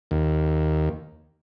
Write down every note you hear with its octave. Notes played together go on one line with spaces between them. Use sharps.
D#2